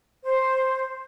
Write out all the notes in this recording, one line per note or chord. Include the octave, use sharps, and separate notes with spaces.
C5